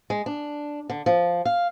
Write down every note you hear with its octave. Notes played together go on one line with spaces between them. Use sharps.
G#3
D4
D3
F3
F5